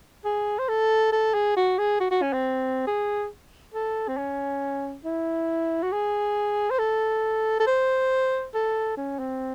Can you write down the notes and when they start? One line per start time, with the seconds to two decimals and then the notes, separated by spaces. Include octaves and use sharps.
0.25 G#4
0.59 C5
0.69 A4
1.13 A4
1.34 G#4
1.57 F#4
1.79 G#4
2.00 F#4
2.11 F#4
2.22 C#4
2.33 C4
2.87 G#4
3.74 A4
4.08 C4
4.17 C#4
5.05 E4
5.82 F#4
5.92 G#4
6.71 C5
6.79 A4
7.60 A4
7.67 C5
8.54 A4
8.97 C#4
9.19 C4